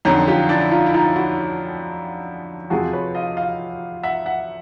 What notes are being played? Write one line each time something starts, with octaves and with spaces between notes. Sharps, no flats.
F2 D3 F#3 C#4 D#4
F4 G4
D4 E4
E4
D#4 F4
E4
D#4 F4
E4 F#4
F2 C3 F3 F#4 G#4
B4 C#5
D#5 F5
D#5 F5
E5 F#5
E5 F#5